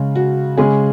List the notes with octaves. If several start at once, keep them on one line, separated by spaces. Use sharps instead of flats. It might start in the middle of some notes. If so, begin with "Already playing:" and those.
Already playing: C#3 G#3 C#4
F#4
C#3 G#3 C#4 G#4